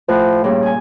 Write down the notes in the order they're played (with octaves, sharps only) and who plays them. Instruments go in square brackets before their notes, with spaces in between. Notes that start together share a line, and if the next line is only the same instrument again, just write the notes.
[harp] A2 F#6 [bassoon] F3
[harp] G2 A#2 D4 [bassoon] C#3
[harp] G#4 G#5